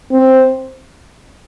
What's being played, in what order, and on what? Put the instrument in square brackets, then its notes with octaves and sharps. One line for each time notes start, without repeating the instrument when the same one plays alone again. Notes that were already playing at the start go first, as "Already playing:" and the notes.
[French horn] C4